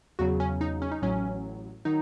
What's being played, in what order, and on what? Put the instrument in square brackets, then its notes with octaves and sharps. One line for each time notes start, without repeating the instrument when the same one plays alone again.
[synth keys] E2 C#3 F#3 F#4
C#4
D#4
C#4
D#4
A1 A2 F#3 C#4
D#3 F#3 D#4